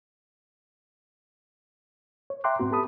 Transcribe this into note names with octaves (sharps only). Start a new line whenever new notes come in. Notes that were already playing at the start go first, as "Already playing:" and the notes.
C#5
E5 G5 A#5 C6 D6 F#6
G#2 B3 C4 F#4
B3 G4 A4 A5 B5 D#6